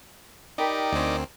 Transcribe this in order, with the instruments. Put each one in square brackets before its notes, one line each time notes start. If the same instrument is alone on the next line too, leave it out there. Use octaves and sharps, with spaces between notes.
[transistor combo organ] D#4 D5 [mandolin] G4 A#4 B5
[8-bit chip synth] D2 C4 [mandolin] C#4 A#4